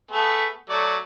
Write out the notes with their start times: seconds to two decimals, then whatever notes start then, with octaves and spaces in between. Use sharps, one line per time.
0.11 A3 B3 G#4
0.69 F#3 A3 D5